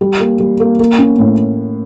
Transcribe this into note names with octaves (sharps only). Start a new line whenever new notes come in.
G3
A#3
G3
A#3
A#3
C#4
A2